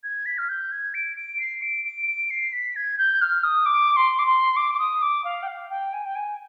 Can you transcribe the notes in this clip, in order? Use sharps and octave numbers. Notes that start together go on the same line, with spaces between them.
G#6
B6
F6
G6
G#6
D7
D7
C7
D7
D7
D7
C7
B6
G#6
G6
F6
D#6
D6
C6
D6
C6
D6
D6
D#6
D6
F5
G5
F5
G5
G#5
G5
G#5